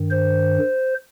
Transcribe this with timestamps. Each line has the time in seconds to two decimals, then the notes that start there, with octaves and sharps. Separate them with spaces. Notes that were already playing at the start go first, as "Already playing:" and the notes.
Already playing: G2 D#3
0.11 C5